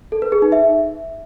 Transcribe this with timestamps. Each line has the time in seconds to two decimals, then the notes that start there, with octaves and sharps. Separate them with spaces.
0.12 A4
0.22 B4
0.32 G#4
0.42 D#4
0.52 E5